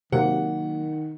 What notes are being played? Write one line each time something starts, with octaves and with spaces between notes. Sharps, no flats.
C3 D#3 F#3 A#3 F#5